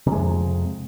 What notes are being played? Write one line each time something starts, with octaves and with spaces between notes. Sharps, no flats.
F2 C3 G#3